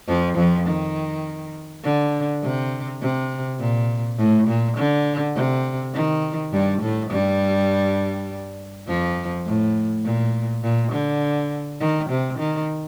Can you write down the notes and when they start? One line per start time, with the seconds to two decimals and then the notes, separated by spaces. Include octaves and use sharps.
0.08 F2 F3
0.37 F2 F3
0.67 D#3
1.84 D3
2.43 C3
3.01 C3
3.60 A#2
4.19 A2
4.48 A#2
4.77 D3
5.35 C3
5.94 D#3
6.53 G2 G3
6.82 A2 A3
7.11 G2 G3
8.88 F2 F3
9.46 A2
10.05 A#2
10.63 A#2
10.92 D3
11.81 D#3
12.10 C3
12.39 D#3